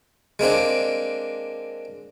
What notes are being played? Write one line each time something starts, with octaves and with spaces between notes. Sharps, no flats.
G#3 A#3 C4 D4